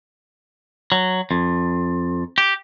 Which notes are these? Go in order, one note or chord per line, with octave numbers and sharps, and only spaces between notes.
F#3
F2
G4